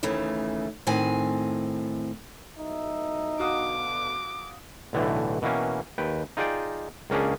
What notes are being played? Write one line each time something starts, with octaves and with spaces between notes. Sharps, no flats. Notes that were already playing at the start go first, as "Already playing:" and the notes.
D#2 C#3 E3 A3
A2 D#3 C4 G#5
B1 A2 D#4 E5
B2 D3 F#4 F5 D6 D#6
B1 A2 D3 E3 A3
B2 E3 A#3 C#4
D#2 B4 G5
D#4 F4 G#4 D5 G5
C#2 A#3 C#4 D4 G#4